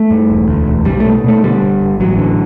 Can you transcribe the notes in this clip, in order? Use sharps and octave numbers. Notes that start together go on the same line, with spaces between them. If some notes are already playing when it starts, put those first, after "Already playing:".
Already playing: A3
G2
E1
D2
E1
B1 G3
B2 A3
B2 A3
D3 G3
G1
G1
A1 F#3
D3